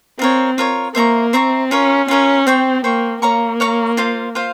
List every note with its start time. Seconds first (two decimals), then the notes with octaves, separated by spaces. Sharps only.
0.19 C4 F4 A#4 C#5
0.58 F4 A#4 C#5
0.95 A#3 C5 E5 A#5 C#6
1.33 C4 C5 E5 A#5 C#6
1.71 C#4 F4 A#4 C#5
2.08 C#4 F4 A#4 C#5
2.46 C4 C5 G5 C#6
2.84 A#3 C5 G5 C#6
3.22 A#3 C#5 F5 A#5 C#6
3.60 C#5 F5 A#5 C#6
3.97 F4 C5 F5
4.35 F4 C5 F5